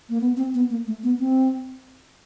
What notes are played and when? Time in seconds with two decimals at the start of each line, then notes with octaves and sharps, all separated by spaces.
0.09 A#3
0.21 B3
0.37 C4
0.54 B3
0.70 A#3
0.87 A3
1.03 B3
1.19 C4